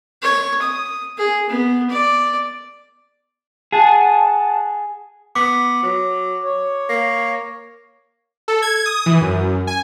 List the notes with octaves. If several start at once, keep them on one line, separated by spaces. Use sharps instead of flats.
C#5
D#6
G#4
B3
D5
G#4 F#5 A5
B3 D6
F#3
C#5
A#3
A4
G#6
D#6
E3
F#2
G#5